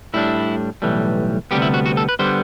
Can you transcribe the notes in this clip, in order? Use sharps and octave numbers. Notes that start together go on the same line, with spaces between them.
A2 G3 D4 E4
B1 A2 E3 G3
D2 C3 G3 B3 G4
E4
F#4
F#4
A4
B4
D3 G3 B3 C5